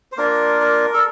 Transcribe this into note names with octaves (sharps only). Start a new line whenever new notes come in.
C5
A#3 D4 F4 A#4
A#4
A4